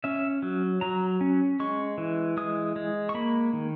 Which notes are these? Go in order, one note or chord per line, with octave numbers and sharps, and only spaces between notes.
C#4 E5
F#3
F#3 A#5
C#4
G#3 C#6
E3
G#3 D#6
G#3
C#6
A#3 B5
D#3